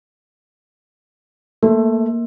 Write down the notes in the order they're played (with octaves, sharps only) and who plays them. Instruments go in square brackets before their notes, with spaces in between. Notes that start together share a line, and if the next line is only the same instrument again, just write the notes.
[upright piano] A3 [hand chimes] A#3